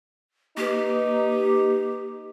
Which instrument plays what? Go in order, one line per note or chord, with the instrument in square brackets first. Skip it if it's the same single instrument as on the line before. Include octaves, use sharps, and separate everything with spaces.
[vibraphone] A#3 B4 [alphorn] D#4 [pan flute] G4